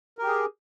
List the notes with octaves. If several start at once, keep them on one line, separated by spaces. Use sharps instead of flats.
G4 G#4 A#4